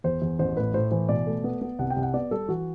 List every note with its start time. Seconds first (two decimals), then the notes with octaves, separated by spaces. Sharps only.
0.04 E2 C5
0.22 E2
0.39 A1 C5
0.57 A2 B4
0.74 A2 C5
0.91 E3 C5
1.09 B2 D5
1.27 A3
1.44 B3
1.61 B3
1.79 C2 F#5
1.90 G5
1.96 C2
2.02 F#5
2.14 B3 D5
2.31 G3 A4
2.48 E3 F#4